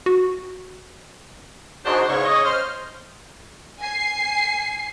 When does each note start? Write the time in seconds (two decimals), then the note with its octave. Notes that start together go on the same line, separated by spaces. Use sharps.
0.06 F#4
1.86 D4 D#4 F#4 G#4 A#4 C5
2.09 E2 G#2 C#3 C#5 C#6
2.25 D#5
2.44 C5 F6
3.80 G#5 C7